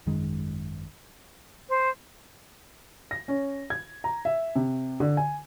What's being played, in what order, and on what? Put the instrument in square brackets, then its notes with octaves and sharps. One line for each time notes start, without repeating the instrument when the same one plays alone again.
[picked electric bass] G#1 F#2 D#3 G#3
[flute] C5
[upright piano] A#6
C#4
G#6
A#5
E5
C3
D3
G#5